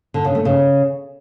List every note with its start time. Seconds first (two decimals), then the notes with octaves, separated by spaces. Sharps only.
0.14 D3
0.25 C#3
0.35 A3
0.45 C#3